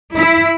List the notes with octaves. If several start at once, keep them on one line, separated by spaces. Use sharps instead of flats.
E4